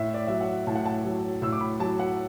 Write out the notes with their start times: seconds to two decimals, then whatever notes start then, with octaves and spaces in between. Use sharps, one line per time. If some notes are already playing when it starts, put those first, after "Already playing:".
Already playing: A2 E5
0.14 D5
0.27 F#3 E5
0.41 F#5
0.67 A2 A5
0.76 F#5
0.86 A5
1.05 F#3
1.42 A2 E6
1.52 D6
1.61 B5
1.80 F#3 A5
1.99 F#5